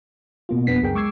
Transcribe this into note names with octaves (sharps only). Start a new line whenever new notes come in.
B2 A#3 F4
F2 B3 D4 B6 C7
C#2 F#2 G#4 A#4 G5
G#3 C#6 D6 E6 G#6 C7